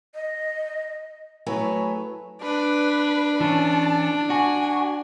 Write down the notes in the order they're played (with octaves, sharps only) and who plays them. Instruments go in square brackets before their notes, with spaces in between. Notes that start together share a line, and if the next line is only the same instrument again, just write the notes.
[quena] D#5
[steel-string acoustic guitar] E3 F#3 A3 G#4 B4 C#5
[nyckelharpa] D4 [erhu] B4
[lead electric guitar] E3 C#4 [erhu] A5
[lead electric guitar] F#4 [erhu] G#5